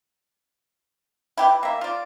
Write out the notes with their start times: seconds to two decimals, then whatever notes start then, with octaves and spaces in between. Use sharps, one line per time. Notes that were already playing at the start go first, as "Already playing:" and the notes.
1.37 E4 G4 B4
1.63 A#3 E5
1.81 F4 D5